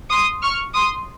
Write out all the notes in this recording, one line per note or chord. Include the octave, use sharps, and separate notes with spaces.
C6 D#6
C#6 F6
C6 D#6